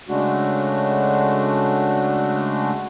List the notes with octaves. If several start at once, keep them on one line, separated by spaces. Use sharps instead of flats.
C#3 G#3 A3 D4 F#4